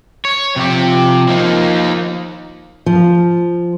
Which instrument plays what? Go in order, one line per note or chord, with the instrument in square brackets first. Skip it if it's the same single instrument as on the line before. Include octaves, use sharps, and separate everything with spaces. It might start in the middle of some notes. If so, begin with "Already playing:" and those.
[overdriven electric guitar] C#5
[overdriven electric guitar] C3 G4 [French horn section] F3
[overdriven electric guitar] A#3 D#4
[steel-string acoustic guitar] F3